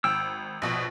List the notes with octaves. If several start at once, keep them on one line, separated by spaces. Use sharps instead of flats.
G#1 G5 E6
A#1 B2